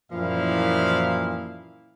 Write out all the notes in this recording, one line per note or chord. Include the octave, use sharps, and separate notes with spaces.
F#2 A#2 E3 F3 E4 F5